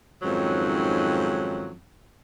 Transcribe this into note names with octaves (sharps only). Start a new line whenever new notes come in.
F2 G#2 D#3 F#3 C#4